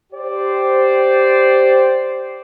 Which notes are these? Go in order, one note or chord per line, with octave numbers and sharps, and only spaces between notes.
G4 C5 D5